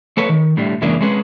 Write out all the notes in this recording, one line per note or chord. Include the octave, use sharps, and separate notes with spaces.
A3 A4 B4 C#5
D#3
A2 D3 G3
F#2 C#3 E3 G#3 A#3 D4
G#3 C4 C#4 G#4 B4